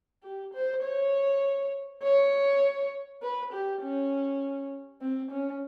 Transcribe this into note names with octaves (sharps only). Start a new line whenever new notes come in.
G4
C5
C#5
C#5
B4
G4
C#4
C4
C#4